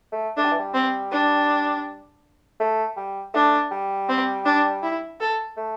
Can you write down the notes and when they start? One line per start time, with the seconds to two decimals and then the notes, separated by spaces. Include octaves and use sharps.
0.12 A3
0.37 A3 D4
0.44 G3
0.51 E3
0.59 G3
0.74 C4
1.11 D4
2.60 A3
2.97 G3
3.34 A3 D4
3.71 G3
4.09 C4
4.45 D4
4.83 E4
5.20 A4
5.57 A3